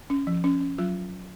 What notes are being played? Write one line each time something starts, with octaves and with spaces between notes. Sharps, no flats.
C#4
F3
C#4
C#4
F#3 F4